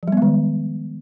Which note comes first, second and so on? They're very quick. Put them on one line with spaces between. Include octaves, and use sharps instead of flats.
F3 G3 B3 G#3 D#3